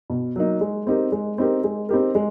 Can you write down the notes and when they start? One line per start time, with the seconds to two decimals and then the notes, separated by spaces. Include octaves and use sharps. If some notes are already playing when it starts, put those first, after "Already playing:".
0.10 B2
0.36 F#3 A#3 D#4
0.61 G#3
0.87 C4 D#4 G4 A#4
1.12 G#3
1.38 C4 D#4 G4 A#4
1.64 G#3
1.89 C4 D#4 G4 A#4
2.15 G#3